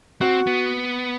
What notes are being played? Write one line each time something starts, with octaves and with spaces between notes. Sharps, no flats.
C4 F#4
B3